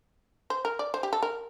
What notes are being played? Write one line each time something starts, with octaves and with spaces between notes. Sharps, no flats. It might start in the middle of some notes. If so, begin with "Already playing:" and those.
C5
A#4
D5
C5
G4
A4
A#4